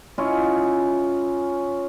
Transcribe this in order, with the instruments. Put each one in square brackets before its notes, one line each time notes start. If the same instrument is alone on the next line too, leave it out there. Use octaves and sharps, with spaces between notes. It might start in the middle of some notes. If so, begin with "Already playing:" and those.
[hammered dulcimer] C#4 E4 F4 D#5